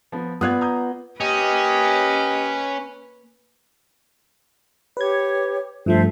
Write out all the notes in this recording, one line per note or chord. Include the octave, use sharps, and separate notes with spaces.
F3 B3
B3 F4 D5 D#6 F#6 G#6
A#5 D#6 G6
A#3 C#4 G4 B4 D#5
G4 B4 C#5 G#6
G2 F3 A3 A4 C5 E5